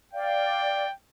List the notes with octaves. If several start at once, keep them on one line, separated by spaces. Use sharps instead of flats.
D5 F5 G5